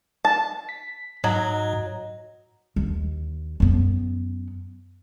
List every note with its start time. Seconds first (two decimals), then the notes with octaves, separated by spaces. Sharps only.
0.25 A5
0.69 B6
1.24 G#2 F#3 D#5 A#5
2.76 D#2
3.60 F#2 B3